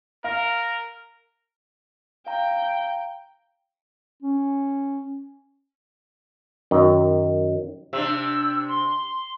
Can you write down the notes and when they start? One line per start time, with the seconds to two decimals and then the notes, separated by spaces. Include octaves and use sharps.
0.24 A#4 F5
2.27 F5 G5 A#5
4.22 C#4
6.71 F#2 D#3
7.93 C3 D4 E6
8.69 C6